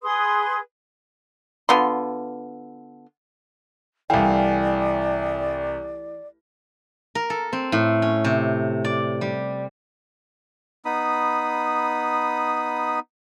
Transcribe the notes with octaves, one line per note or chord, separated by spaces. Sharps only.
G#4 B4 C6 D#6
D3 B3 F4 C6
C2 E3 A3 E4 D5 F5 G5 G#5
A#4
A4
C4
A2
C#4
C3
D5
G3
B3 D#4 B5 D#6